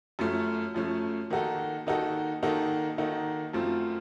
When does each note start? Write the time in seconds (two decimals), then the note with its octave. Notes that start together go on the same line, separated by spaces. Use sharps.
0.19 F#2 F3 A3 C#4
0.75 F#2 F3 A3 C#4
1.30 D#3 A#3 D#4 F#4 A4
1.87 D#3 A#3 D#4 F#4 A4
2.43 D#3 A#3 D#4 F#4 A4
2.98 D#3 A#3 D#4 F#4 A4
3.53 F#2 F3 A3 C4 F4